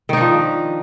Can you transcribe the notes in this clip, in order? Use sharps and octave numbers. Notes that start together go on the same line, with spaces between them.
D#3 F3 D4 D#4